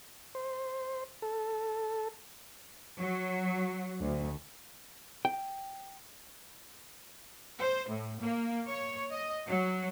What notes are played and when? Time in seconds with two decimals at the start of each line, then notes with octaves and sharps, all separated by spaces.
0.35 C5
1.22 A4
3.00 F#3
4.01 D2
5.25 G5
7.59 C5
7.88 A2
8.21 A#3
8.68 C#5
9.11 D#5
9.47 F#3